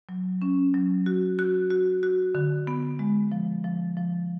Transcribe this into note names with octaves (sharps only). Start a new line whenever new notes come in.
F#3
C#4
F#3
F#4
F#4
F#4
F#4
D3
B3
G#3
F3
F3
F3